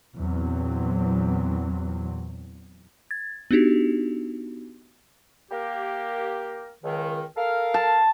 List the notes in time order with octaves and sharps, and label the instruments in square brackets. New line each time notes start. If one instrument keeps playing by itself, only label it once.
[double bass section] E2 A#2 F#3 C4
[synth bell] G#6 A6
B3 D4 D#4 F#4 G4
[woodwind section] A#3 G4 A#4
C#2 D#3
A4 A#4 F5
[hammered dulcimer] A5